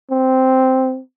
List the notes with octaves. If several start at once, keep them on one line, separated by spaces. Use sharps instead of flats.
C4